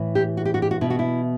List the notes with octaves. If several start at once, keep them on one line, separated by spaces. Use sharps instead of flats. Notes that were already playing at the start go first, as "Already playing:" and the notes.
Already playing: A2 E3
G4
F#4
G4
F#4
G4
F#4
B2 E4
F#4
E4